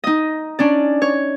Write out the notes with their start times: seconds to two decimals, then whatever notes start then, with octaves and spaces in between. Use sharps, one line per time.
0.04 D#4 D#5
0.59 C#4 D4 D5
1.02 C#5